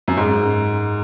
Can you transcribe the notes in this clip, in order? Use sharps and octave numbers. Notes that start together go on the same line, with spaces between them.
F#2
G#2